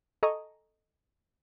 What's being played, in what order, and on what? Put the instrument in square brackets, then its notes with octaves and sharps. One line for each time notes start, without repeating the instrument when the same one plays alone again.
[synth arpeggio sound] A4 D#5 G#5 A#5 C#6 D#6